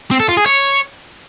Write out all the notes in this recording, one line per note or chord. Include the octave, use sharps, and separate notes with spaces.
C4
A4
F4
G#4
C#5